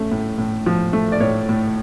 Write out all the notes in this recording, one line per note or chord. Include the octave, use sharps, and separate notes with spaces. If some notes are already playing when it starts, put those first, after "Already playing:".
Already playing: A3 C#4
A2
A2
F3
A3
D5
A2 C#5
A2